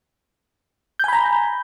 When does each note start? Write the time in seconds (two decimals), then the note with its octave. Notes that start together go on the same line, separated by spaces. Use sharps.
0.99 G6
1.04 G#5
1.08 B5
1.13 A#5